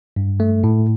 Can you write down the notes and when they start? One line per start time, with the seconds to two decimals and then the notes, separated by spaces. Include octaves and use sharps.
0.16 G2
0.40 A3
0.64 A2